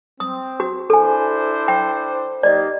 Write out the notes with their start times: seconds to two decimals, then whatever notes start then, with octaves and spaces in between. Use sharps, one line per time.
0.20 C4 D#6
0.60 F#4
0.90 D4 E4 A4 C5 G#5
1.68 G5
2.43 A#3 D#4 G4 D5 D#5